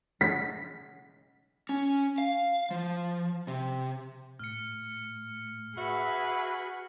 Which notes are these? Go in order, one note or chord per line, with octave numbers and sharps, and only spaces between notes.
B6
C#4
F5
F3
C3
A2 F6 C#7
F#4 G#4 B4 E5